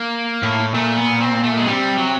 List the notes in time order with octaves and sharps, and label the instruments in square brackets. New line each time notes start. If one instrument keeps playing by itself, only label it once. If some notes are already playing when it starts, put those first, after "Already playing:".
Already playing: [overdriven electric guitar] A#3
[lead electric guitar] A2
[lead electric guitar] A#2 [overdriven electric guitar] A3
[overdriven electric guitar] B3
C4
A3
G#3
[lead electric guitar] C3 [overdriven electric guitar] G3
[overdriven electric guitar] F#3